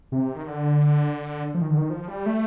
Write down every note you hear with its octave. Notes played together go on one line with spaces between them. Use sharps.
C3
D#3
D3
F3
D#3
D3
D#3
F3
G3
A3